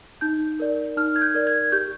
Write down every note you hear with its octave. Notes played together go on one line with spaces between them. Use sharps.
D#4 G6
A#4 D5
D#4 F6
G#6
G6
A#4 D5
G#6
G4 G6